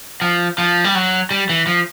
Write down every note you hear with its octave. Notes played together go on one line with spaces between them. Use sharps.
F3
F3
G3
F#3
G3
E3
F3